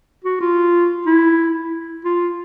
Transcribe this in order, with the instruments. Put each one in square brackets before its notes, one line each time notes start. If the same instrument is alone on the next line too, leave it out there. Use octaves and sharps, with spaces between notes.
[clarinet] F#4
F4
E4
F4